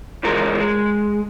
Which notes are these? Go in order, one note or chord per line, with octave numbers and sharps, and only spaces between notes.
C#3 E3 F3 G#3 A#4
G#3